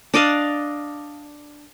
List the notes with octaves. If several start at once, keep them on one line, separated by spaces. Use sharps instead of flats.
D4 D5 D#5 F5